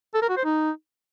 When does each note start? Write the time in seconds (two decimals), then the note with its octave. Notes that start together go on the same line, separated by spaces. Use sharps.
0.15 A4
0.22 A#4
0.30 F#4
0.37 C5
0.45 D#4